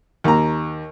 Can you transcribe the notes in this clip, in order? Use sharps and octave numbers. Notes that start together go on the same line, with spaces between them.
D#2 A#5